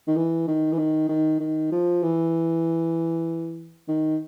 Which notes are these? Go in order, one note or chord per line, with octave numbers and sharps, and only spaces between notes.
D#3
E3
D#3
E3
D#3
D#3
D#3
F3
E3
D#3